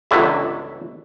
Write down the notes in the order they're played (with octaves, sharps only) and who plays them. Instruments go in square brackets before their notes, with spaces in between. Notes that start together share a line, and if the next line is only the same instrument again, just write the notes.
[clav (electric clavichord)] G1 C#2 D3 E3 F#3 E5